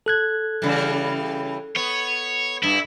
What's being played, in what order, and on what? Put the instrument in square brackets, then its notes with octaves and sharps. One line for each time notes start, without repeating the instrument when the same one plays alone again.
[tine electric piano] A4 F#6 G#6
[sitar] C#3 E3 G3
[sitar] B3 [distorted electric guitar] C#5
[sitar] G2 [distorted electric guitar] E4